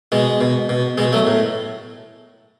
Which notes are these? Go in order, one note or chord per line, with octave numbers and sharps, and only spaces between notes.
B2 G#3
B2
B2
B2 G#3
F#3 A3
A2